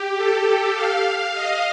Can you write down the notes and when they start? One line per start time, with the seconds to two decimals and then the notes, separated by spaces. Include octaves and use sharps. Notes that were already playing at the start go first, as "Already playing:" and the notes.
Already playing: G4
0.17 A4
0.74 F5
1.34 D#5